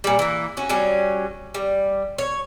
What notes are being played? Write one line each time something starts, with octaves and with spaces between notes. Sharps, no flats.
A#2 G3
E3 A#3
C#4 F#4
F#3 G3 C#4
G3
C#5